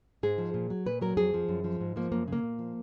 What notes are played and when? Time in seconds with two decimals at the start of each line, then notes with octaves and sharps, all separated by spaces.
0.23 G#2 G#4
0.38 F3
0.54 A#2
0.70 F#3
0.86 A#2 B4
1.01 F#3 A#4
1.17 F2 G#4
1.34 F3
1.48 F#2
1.64 F3
1.81 G#2
1.96 F3 A#3
2.12 F#2 A#3
2.28 C#3 A#3
2.43 A#2
2.59 F3